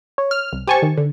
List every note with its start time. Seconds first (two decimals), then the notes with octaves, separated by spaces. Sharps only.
0.18 C#5
0.31 F6
0.53 C2
0.67 G4 C5 G#5 A5 C#6
0.82 D#3
0.97 D3